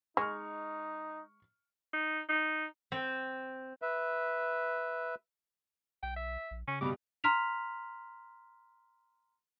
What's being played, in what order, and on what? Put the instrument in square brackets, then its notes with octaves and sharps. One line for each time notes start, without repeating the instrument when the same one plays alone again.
[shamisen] G#3 [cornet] D#4 [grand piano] C#6 F6
[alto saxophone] D#4
D#4
[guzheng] C4
[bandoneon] B4 E5
[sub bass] B1 [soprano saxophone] G5
[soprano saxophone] E5
[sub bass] A#1
[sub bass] C#3 [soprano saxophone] C#4
[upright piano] G2 B2 G3 [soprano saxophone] D6
[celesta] A#5 C6 F6 B6 F7